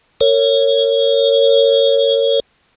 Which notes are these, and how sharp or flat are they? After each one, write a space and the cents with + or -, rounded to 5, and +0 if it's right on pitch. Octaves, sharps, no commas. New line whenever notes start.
A#4 -35 C#5 +0